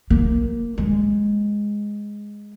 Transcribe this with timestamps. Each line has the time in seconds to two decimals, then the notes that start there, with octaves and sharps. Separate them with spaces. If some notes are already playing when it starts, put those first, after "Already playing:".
0.10 A#3
0.78 G#3